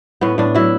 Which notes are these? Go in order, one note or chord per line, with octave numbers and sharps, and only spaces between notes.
A2 B3
A2 D4
F#3 E4